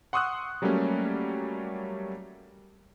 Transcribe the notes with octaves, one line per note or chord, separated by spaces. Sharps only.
F#5 C6 C#6 D#6 E6 F#6
F#3 G3 A3 A#3 C#4